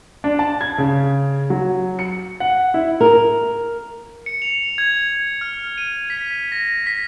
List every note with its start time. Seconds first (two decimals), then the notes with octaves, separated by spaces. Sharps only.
0.24 D4
0.39 A5
0.61 G#6
0.78 C#3
1.50 F#3
1.99 C#7
2.40 F#5
2.74 E4
3.00 A#4
4.26 C#7
4.42 F7
4.78 G#6
5.41 F6
5.78 D#7
6.10 B6
6.52 A#6
6.87 B6